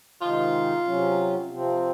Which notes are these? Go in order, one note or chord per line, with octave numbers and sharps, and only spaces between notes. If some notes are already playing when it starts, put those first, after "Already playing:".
C3 D#3 G#3 D#4 F4
C3 F#3 C#4
C3 F3 C4